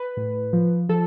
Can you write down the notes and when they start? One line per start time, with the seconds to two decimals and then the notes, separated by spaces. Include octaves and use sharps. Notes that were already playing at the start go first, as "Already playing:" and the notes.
Already playing: B4
0.17 A2
0.53 F3
0.89 F3 A4